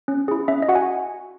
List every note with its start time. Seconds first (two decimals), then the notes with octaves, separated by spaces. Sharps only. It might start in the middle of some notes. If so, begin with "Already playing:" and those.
0.08 C#4
0.28 E4 G#4
0.48 C#4 E5
0.62 D#5
0.69 F#4 F#5
0.75 G#5